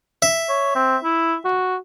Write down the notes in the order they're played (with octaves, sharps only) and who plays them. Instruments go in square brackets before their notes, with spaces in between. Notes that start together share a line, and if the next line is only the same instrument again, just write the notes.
[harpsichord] E5
[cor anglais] C#5
C4
E4
F#4